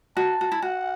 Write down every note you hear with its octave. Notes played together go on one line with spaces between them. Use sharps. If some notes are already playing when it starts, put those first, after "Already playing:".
F#4 A5
F#4
E4
F#4 F#5